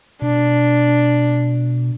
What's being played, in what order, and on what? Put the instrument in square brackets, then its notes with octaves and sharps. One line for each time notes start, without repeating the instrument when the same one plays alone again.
[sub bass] B2 [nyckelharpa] D4